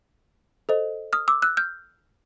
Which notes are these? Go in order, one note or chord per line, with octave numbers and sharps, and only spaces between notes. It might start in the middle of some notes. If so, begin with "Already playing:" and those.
A4 C5 D#5
D#6 F6
D6 E6
E6 F#6
F6 G6